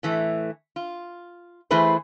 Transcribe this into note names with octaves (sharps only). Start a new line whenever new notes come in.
A2 E3 A3
F4
E3 A3 E4 G#4 B4 C5